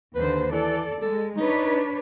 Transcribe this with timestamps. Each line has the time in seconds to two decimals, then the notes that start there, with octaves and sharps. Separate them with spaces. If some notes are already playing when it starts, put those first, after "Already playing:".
0.15 D#2 D3 B4 C5
0.52 E3 A4 D5
1.02 G#3 A4
1.37 D4 D#4 B4 C#5